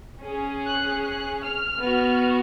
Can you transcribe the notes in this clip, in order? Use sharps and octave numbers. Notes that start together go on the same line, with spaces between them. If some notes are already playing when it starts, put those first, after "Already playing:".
C#4 G#4
F#6
F#6
F6
B3 F#4